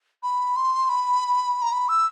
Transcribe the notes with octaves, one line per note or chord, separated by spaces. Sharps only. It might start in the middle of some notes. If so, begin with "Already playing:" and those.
B5
C6
B5
A#5
B5
E6